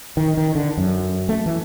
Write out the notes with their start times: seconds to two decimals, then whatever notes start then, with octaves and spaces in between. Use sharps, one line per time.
0.17 D#3
0.37 D#3
0.55 D3
0.77 F#2
1.29 A3
1.46 E3